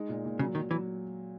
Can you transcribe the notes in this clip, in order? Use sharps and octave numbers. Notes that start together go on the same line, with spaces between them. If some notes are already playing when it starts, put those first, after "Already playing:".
Already playing: G#3 D#4
A#2
A#2
C#3 F#3
D#3 F#3
E3 F#3